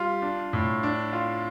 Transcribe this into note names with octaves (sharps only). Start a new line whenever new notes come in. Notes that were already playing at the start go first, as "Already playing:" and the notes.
Already playing: G3 F4
D4
A2
D4
F4